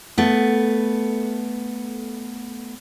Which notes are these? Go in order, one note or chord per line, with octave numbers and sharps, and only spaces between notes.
A3 B3